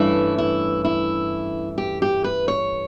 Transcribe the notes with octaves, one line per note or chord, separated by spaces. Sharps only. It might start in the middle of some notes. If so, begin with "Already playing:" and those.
Already playing: G2 E3 A3 C#4 E4
E4
E4
G4
G4
B4
C#5